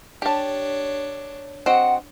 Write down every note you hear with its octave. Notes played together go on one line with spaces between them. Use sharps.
D4 G4 C#5 A5
C4 F#4 D#5 F#5